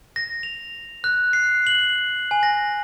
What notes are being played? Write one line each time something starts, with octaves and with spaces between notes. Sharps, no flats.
A#6
F7
F#6
C7
F#7
G#5
A#6